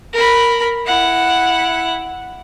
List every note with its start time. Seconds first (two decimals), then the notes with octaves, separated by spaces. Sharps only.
0.13 A#4 B5
0.86 E4 F#5